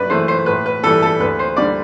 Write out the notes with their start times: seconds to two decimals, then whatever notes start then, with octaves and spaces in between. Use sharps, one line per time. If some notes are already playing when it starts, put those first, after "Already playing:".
Already playing: F#2 B4 D5
0.10 E3 A3 C5
0.28 C5
0.46 A2 B4
0.66 B4
0.84 E3 G3 A4
1.02 A4
1.20 D2 B4
1.39 C5
1.56 D3 G3 D5